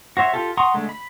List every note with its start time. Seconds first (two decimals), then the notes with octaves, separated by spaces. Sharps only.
0.17 F#4 C5 C#5 E5
0.34 F4 G4 A4
0.57 F#5 A#5 C6 C#6 D#6
0.74 D3 G#3 A3
0.89 B5